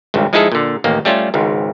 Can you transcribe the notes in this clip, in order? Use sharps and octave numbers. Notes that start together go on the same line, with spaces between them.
G#1 C#2 G2
F3 G#3 D#4 E4 G#4 A4
A#2 D3
A1 D#2 A#3
G3 A3 C#4 F4
G#1 C#2 G#2